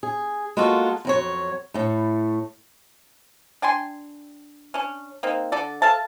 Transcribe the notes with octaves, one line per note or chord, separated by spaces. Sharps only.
G#4
G#3 A#3 F4 F#4 A4
F2 F#3 C#5
A2 A3
D4 G5 G#5 C6
C#4 D4
A#3 C4 D#4
D3 A4 D5
A4 E5 F5 A5